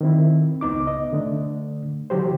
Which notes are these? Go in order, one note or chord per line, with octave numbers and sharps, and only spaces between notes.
D#3 C4 E4
C#2 B3 D#4 D6
D#5
D3 A3 D4
D3 E3 F#3 G4 C5